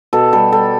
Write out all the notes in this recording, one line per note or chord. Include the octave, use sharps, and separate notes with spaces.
B2 A4
G3 A4
G3 A4